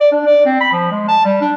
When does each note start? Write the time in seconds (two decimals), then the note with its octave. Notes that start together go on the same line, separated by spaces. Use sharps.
0.01 D5
0.12 D4
0.26 D5
0.46 C4
0.60 B5
0.73 F3
0.91 G#3
1.08 A5
1.25 G3
1.41 D4